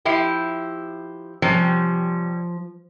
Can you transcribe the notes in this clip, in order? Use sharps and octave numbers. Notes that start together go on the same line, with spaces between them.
F3 E4 G4
C3 F3 G3 C#4